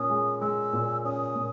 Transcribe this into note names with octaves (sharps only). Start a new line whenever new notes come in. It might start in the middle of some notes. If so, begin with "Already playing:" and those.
Already playing: A#2 C#4 D#6
G#3
G#3 E6
A#2
C#4 D#6
A#2